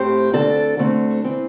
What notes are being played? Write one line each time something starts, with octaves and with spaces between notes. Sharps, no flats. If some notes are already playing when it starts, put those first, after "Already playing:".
Already playing: A2 A3 C4 G4 C5
D2 D3 C4 A4 D5
D2 D3 A3 C4
E3 C4